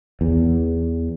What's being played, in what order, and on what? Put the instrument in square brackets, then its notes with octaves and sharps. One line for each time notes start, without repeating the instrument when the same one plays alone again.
[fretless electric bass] E2